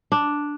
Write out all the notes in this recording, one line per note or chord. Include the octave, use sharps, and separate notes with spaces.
D4